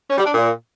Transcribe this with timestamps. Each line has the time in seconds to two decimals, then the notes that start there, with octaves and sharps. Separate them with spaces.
0.10 C#4
0.18 G3
0.26 D4
0.34 A#2